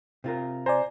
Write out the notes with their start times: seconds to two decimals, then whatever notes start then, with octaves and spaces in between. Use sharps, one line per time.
0.24 C3 F4 A#4
0.66 C5 D5 G#5 A#5